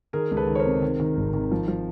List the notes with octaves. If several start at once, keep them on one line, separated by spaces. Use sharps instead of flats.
D#3 G#4 A#4
C#2
A4 B4
D#3
C#5
A#4 C5
C3
D#3
D#3
G#1
D#3
F3
F3